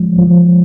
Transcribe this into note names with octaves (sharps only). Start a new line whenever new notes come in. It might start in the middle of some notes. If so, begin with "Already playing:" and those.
Already playing: F3 G#3
F3